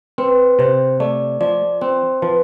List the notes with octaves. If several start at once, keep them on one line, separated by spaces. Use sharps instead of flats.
C4 B4
C3 C5
A3 D5
F3 D5
C4 C5
F3 B4